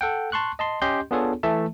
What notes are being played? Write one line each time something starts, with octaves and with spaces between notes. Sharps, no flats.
A4 F#5 G5
A5 C6 C#6 F#6
D#5 A5 C6
C#4 G4 D#5 C6 G6
B3 D4 F4 G#4 A4 C#5
E3 A3 E5 A5